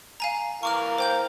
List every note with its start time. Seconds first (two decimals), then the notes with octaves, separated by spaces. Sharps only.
0.20 F5 G#5 A#5
0.63 E3 A#4 F5 C#6 D6 F6
0.98 C5 G5 G6